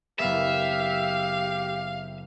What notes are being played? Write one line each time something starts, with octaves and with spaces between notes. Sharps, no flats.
F#1 B3 G4 E5 F5